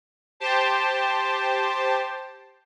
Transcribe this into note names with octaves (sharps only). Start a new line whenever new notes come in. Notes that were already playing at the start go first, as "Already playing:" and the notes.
G4 C5 A5